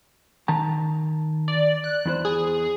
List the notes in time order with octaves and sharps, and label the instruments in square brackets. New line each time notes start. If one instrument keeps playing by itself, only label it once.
[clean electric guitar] D#3 A5 A#5
[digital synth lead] D5
F#6
[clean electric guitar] E2 E4 C5
[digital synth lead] G#4